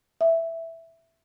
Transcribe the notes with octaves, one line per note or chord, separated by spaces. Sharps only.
E5